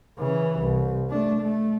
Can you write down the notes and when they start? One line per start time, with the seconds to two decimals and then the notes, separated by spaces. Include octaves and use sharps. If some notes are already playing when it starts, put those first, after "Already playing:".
0.19 C#3 E3
0.60 C2
1.09 A3 D4
1.41 A3